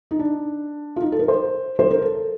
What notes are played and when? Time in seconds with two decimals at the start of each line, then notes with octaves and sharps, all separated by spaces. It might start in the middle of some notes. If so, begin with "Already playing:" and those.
0.11 D#4
0.19 D4
0.96 F4
1.02 D#4
1.12 A4
1.19 A#4
1.28 C5
1.79 C5
1.91 A#4
2.02 A4